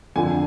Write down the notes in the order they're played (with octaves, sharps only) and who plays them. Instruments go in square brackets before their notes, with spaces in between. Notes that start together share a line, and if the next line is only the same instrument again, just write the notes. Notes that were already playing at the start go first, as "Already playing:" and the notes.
[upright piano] F2 D3 F3 G#5